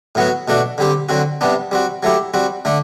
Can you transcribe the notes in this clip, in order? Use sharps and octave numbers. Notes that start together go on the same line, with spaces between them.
A2 F#3 B3 F#4
B2 A3 D4 F#4
D3 G3 C4 G4
D3 F#3 C4 F#4
C3 G3 B3 D4
G3 C4 F#4
F#3 A3 E4 G4
G3 C4 F#4
D3 A3 D4